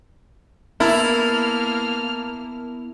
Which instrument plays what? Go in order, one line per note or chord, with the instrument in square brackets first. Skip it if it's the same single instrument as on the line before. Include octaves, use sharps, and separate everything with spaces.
[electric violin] A#3 F6 [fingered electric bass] B3 [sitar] E4 [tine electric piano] A#4 A5